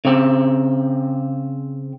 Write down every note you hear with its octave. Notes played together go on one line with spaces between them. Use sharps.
C#3 C4